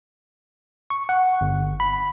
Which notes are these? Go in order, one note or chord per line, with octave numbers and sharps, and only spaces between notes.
C#6
F#5
G1
B5